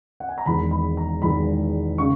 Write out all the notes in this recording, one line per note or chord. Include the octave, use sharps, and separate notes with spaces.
F#5
G#5
A#5
E1 E2 D#3 G#3 B5
B5
A#5
E1 E2 D#3 G#3 B5
C#3 C#6